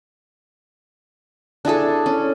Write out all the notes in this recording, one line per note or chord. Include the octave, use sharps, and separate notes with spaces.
D4 E4 G#4 A4
C#4